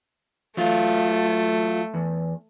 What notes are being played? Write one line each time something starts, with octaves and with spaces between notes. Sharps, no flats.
F#3 A3 F4
E2